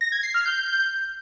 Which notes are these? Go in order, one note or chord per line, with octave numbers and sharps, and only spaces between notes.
A#6
G#6
C7
F6
G6